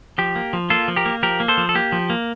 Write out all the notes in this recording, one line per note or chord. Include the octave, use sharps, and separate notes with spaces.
F3 G4
A#3
F3
A#3 F4 A4
F3
G4 A#4
A#3
F3 G4 A#4
A#3
A4 C5
F3
A4
A#3 G4
F3
A#3